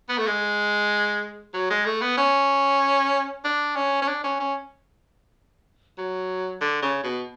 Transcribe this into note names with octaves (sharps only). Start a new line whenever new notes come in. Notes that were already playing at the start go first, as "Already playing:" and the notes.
B3
A3
G#3
F#3
G#3
A3
B3
C#4
D4
C#4
C#4
D4
C#4
C#4
F#3
D3
C#3
B2